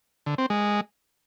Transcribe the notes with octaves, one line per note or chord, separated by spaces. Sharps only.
D3
C4
G#3